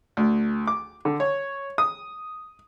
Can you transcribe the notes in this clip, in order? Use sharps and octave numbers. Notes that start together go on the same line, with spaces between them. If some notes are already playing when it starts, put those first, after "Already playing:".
D2
D6
D3
C#5
D#6